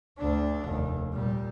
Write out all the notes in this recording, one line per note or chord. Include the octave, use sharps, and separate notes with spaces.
D2 D4
F1 D#2
A#2 G3